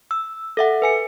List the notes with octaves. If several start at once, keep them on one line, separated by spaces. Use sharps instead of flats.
E6
A4 E5 F#5
B4 G#5 C#7